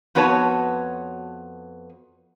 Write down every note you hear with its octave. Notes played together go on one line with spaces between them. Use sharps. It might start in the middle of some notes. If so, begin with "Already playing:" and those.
F2 B3 F#4 B4 C#5 A5